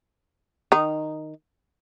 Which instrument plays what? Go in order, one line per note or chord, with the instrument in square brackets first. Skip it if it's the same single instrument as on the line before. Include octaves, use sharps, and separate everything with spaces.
[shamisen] D#3 D#4